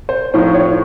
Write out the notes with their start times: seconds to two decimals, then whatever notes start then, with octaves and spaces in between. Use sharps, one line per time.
0.09 C5
0.34 A2 F3 C4 D#4 C5
0.54 C#5